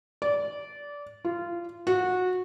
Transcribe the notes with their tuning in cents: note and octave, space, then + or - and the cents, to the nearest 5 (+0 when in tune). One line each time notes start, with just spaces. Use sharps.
D5 -20
F4 -20
F#4 -20